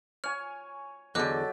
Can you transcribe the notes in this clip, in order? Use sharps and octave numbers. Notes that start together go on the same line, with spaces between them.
C#5 G#5 F6
E2 D3 F#3 G4 A4 D#5 D6 F#6